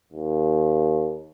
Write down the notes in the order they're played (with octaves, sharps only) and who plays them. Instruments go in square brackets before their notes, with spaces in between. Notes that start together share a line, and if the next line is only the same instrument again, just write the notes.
[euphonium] D#2